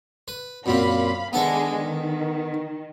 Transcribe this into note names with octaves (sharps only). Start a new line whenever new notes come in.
B4
F#2 A#2 C4 F5 B5
D#3 G#3 B3 D4 A4 E5
D#3